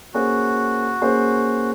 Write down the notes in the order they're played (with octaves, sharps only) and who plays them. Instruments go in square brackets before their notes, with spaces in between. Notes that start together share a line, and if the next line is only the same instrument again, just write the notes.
[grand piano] A#3 C#4 G#4 C5 [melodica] F#4
[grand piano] A#3 C#4 G#4 C5